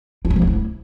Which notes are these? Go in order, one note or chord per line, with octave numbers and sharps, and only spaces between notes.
F4
C#4
F3
A3
E4